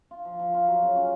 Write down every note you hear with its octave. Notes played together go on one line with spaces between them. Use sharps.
F4
F3
F3
F4
F#3
C#3
C#4